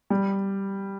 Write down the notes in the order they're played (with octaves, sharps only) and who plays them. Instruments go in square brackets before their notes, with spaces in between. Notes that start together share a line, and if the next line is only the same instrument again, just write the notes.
[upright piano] G3